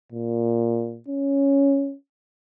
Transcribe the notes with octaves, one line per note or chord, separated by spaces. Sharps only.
A#2
C#4